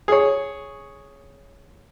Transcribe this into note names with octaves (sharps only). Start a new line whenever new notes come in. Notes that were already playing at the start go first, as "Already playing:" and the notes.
G#4 C#5